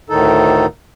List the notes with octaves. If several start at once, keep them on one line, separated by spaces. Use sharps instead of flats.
D2 A2 D#3 D#4 A4